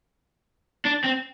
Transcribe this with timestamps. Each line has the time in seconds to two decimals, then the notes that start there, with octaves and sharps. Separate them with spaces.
0.85 D4
1.04 C4